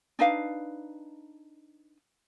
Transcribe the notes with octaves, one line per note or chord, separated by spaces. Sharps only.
D4 D#4 B4 F5